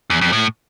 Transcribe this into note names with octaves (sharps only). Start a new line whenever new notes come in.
E2
F2
A2